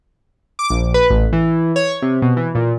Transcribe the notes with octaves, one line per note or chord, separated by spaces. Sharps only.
D6
A#1
B4
A1
E3
C#5
C3
B2
E3
A#2